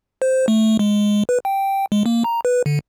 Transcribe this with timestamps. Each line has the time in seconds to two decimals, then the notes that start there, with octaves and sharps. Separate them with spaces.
0.22 C5
0.48 A3
0.79 G#3
1.29 B4
1.45 G5
1.92 G#3
2.06 A#3
2.24 A#5
2.45 B4
2.66 D3